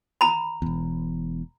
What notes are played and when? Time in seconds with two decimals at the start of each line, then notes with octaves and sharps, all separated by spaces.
0.21 A#5 B5
0.62 E1 E2